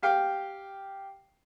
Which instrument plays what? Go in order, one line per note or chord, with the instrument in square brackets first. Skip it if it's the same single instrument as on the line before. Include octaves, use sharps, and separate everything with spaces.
[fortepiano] G4 F5 G5